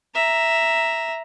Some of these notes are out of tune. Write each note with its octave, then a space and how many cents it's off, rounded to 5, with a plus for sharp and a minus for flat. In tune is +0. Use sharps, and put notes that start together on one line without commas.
E5 +0 A#5 +0